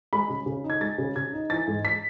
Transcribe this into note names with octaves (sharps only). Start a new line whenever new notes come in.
G#3 B5
C#3
C#3
D#4
G#6
G#3 A6
C#3
C#3 G#6
D#4
E3 A6
G#2
B6